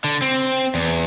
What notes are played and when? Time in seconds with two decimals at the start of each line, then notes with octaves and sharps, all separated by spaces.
0.04 D3
0.22 C4
0.75 E2